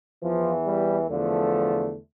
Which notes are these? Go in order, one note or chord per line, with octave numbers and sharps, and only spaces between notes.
E2 E3 F3
G3
E2 D3 F3 A3